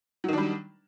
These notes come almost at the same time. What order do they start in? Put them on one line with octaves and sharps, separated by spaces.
F#3 D#3 D4 G3